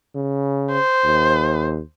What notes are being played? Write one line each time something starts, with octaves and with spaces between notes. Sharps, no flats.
C#3
C5
D#2